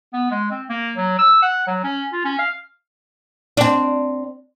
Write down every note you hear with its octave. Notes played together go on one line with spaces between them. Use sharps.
B3
G#3
C4
A#3
F#3
E6
F#5
F#3
C#4
F4
C#4
F5
C4 D4